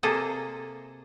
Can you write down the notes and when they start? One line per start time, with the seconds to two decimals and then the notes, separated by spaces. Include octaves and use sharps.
0.03 C3 A#3 G#4 A4 C5 D#5